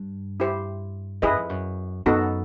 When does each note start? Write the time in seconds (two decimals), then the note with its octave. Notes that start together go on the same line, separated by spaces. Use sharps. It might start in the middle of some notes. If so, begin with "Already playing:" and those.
Already playing: G2
0.40 E4 G4 C5
1.22 F#2 E4 G#4 B4 D#5
1.36 F2
1.49 F#2
2.06 F#2 B3 D#4 F#4 A4